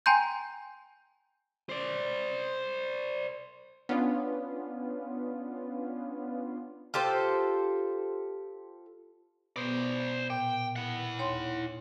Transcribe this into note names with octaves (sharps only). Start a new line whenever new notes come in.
G5 G#5 A#5 C6 G6
C5 D5
B3 C#4 D4 F4
F4 G4 A4 C5
B2 B3 C5 D5
A#2 G5
E4 F#5
D#2 C#5 C6